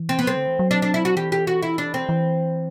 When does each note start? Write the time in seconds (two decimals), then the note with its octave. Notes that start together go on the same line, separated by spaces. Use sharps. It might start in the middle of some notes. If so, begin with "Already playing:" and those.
Already playing: E3
0.09 C4
0.19 B3
0.25 F#3 C4
0.36 D3
0.47 E3
0.59 F#3
0.71 D4
0.82 D4
0.94 E4
1.05 F#4
1.17 E3 G4
1.32 G4
1.47 F#4
1.62 E4
1.78 D4
1.94 C4
2.09 E3